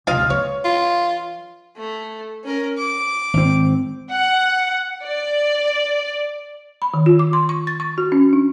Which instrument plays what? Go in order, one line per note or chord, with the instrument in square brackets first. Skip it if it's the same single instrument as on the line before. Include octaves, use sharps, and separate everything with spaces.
[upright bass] F1 C#2 [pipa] F4 D#5 F5
[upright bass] E3 [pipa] C#5
[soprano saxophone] F4
[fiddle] A3
C#4 A#4
D6
[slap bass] G#1 C4
[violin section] F#5
D5
[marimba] B5
D#3
F4
D6
C6
C#6
A6
C#6
F#4
C#4
D4